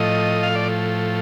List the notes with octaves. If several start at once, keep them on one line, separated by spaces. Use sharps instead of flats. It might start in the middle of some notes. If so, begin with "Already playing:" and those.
Already playing: A2 F3 D#5
F5
D5